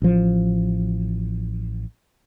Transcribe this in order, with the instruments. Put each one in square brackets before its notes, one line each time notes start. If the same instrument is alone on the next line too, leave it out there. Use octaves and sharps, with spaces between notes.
[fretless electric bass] A1 F3